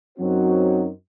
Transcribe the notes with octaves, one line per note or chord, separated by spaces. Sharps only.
F#2 F#3 C4 D#4 F#4 C5